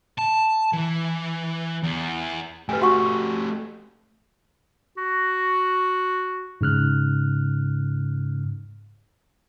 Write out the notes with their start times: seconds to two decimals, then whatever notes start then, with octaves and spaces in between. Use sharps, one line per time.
0.19 A5
0.73 E3
1.84 E2
2.69 A3 G4 B4 G#5
2.82 F#4 F#5 C#6
4.97 F#4
6.61 G#2 C#3 F6 F#6